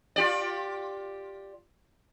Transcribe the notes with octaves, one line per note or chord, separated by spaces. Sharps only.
F4 G4 D5